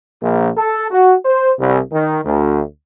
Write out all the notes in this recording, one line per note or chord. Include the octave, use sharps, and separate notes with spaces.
A#1
A4
F#4
C5
C2
D#3
D2